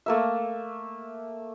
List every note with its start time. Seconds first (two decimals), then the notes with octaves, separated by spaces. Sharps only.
0.06 A3 A#3 E5